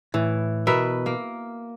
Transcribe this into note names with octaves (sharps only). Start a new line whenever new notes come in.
A2 E3
B2 A#4 B4 E5
A#3